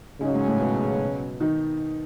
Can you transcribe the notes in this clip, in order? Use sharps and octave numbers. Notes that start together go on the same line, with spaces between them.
G#2 C#3 F#3 G#3 C#4
G#2 G#3
A2 A3
B2 B3
D#3 D#4